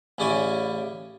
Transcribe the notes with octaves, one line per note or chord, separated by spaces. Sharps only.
A1 C#3 C#4 E4 D5 G#5